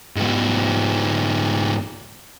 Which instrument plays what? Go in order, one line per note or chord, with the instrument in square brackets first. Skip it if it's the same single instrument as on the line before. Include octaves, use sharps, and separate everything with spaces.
[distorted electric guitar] G#2 B3